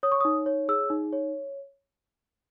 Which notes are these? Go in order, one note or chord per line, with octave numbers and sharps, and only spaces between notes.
C#5 D#6
C#6
D#4 D#6
C#5
G#4 E6
D#4
C#5